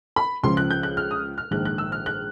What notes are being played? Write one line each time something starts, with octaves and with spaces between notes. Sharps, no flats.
B5
C#2 C#3 F3 C6
F#6
G6
F#6
F6
D#6
F6
A#1 G#2 D#3 F#6
F#6
E6
F6
F#6